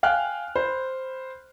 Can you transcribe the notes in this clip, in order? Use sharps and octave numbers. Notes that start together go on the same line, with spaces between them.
F5 G5 G#5 F6 F#6
C5 B5